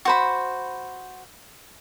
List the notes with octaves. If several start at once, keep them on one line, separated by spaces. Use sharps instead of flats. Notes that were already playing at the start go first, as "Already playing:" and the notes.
F#4 C5 B5